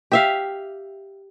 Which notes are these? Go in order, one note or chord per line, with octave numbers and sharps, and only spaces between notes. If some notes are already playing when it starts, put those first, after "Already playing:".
G4 E5 F5